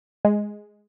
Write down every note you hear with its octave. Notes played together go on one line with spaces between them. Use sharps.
G#3